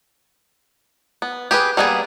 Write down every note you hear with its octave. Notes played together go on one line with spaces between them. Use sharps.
B3
G4 G#4 B4
G3 A#3 B3 F4 G#4